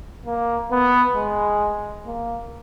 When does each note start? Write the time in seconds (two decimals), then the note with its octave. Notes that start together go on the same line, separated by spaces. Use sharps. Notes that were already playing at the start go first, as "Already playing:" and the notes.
0.26 A#3
0.71 B3
1.15 G#3
2.05 A#3